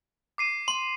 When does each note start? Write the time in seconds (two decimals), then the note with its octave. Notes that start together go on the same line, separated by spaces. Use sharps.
0.38 D6 C7 D#7
0.68 C6